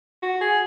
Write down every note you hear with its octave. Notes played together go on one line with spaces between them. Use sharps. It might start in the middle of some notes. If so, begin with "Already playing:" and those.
F#4
G#4